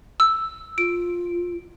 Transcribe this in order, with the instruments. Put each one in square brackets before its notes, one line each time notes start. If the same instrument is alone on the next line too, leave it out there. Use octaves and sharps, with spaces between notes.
[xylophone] E6
[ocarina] F4 [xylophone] D7